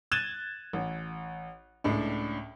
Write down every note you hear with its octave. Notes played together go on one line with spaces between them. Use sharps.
F#6 G#6 A6 D#7 E7 G7
A1
C#2 A2 D4